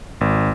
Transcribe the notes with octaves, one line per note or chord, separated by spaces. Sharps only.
G#1